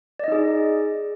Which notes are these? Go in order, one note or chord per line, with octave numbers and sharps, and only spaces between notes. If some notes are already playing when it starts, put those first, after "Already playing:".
D#4 G#4 D5 D#5